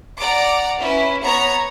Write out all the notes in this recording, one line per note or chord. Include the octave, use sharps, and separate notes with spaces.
D5 F#5 A#5 D6
C#4 E4 B4
B3 C#5 A#5 C#7